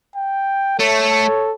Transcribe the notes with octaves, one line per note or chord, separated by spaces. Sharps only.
G5
A3 A4 C#5